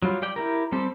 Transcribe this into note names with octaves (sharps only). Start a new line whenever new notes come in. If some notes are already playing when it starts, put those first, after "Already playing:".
F#3 G3 F4
G4 D5 G5
E4 G4 A#4
G3 C4 G4 A4